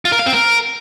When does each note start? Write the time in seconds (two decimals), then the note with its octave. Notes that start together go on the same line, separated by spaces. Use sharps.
0.05 F4
0.12 A#4
0.19 F5
0.26 C4
0.33 A#4